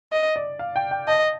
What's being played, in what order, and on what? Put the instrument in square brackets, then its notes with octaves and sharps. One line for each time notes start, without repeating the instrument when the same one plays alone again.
[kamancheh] D#5
[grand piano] D5
F5
G5
G5
[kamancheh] D#5 [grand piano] A5